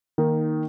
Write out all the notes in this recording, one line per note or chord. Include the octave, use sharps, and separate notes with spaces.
D#3 A#3 D#4 A#4